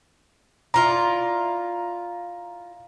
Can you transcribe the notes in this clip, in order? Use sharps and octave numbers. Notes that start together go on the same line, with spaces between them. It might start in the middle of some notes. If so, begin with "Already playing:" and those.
E4 F4 D5 A#5